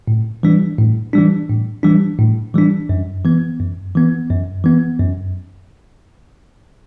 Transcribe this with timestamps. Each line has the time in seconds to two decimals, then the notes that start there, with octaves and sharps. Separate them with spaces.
0.08 A2
0.43 E3 G3 D4
0.79 A2
1.13 E3 G3 D4
1.49 A2
1.83 E3 G3 D4
2.18 A2
2.54 E3 G3 D4
2.89 F#2
3.24 E3 B3
3.59 F#2
3.95 E3 B3
4.30 F#2
4.64 E3 B3
4.99 F#2